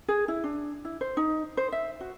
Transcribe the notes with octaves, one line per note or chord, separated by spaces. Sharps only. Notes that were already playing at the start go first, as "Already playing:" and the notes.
G#4
E4
D4
E4
C5
D#4
C5
E5
F#4